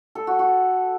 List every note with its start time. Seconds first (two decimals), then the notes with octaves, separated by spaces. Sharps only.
0.15 A4
0.27 F#4
0.39 F#4